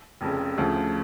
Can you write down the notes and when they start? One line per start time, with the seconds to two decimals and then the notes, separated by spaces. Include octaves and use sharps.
0.21 F1 F2 C#3
0.58 D2 C#3 F3